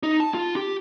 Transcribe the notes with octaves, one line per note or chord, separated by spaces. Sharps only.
D#4
A5
F4
G4